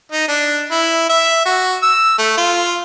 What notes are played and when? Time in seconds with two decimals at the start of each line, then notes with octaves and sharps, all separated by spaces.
0.12 D#4
0.28 D4
0.71 E4
1.09 E5
1.45 F#4
1.82 E6
2.18 A3
2.38 F4